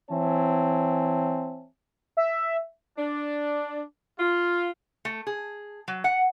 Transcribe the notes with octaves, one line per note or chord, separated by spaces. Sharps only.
E3 C4 C#5 E5 G#5 A5
E5
D4
F4
A3
G#4
F#3
F#5